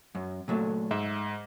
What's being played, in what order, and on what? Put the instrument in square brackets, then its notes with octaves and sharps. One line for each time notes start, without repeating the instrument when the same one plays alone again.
[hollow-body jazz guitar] F#2
A#2 F#3 A3
[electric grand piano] G#2 [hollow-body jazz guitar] E5